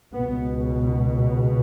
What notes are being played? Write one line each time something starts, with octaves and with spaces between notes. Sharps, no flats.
C#2 B2 B3